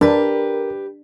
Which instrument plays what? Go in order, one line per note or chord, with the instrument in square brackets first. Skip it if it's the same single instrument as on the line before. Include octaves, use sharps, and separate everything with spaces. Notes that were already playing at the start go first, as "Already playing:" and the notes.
[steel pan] D4 [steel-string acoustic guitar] G4 B4 [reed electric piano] A#4